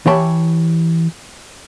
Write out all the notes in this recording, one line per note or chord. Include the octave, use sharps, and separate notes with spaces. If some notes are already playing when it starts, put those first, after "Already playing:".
E3 G4 C#5 A5 B5